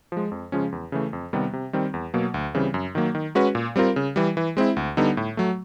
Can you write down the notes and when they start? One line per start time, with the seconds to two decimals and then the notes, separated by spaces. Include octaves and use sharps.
0.12 F3 G#3
0.31 F2
0.52 C#3 F3 G#3 C#4
0.72 E2
0.92 C#3 E3 A3
1.13 F2
1.33 C3 D#3 G3 B3
1.53 C3
1.73 D#3 G3 C4
1.94 E2
2.14 B2 F#3 A#3
2.34 D2
2.54 C#3 E3 G3 C4
2.74 F#2
2.95 D#3 F#3 A#3
3.15 D#3
3.35 G#3 C#4 F#4 B4
3.55 A#2
3.76 G3 C4 F4 A#4
3.96 C#3
4.16 E3 G3
4.37 E3
4.57 G#3 C4 E4
4.77 D2
4.97 D3 G3 B3 D#4
5.17 A2
5.37 F#3 A3